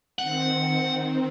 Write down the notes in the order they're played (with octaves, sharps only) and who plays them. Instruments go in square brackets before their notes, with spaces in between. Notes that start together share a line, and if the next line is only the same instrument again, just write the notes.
[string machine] D#3 C4 [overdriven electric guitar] F#5